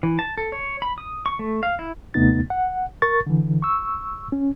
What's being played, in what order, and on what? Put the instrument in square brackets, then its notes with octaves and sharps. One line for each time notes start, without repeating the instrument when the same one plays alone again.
[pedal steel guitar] E3
A5
A4
C#5
B5
D#6
C#6
A3
F5
E4
[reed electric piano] D#2 C3 A3 B3 D#4 A6
F#5
A#4 C#6 A6
D3 E3
C#6 E6
C#4